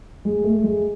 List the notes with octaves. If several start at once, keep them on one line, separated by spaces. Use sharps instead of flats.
G#3
A3
G#3